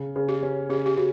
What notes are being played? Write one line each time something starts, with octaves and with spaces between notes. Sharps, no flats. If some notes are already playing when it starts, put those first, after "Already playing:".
Already playing: C#3
C#3
G4
C#4
C#3 G4
G4
C#3 F#4